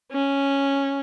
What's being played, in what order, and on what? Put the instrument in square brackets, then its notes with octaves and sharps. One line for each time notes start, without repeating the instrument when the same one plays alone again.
[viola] C#4